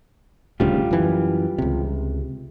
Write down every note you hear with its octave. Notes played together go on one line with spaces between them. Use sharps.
D#1 D2 C#3 G3 F4 G4
F#2 E3
C#2 C3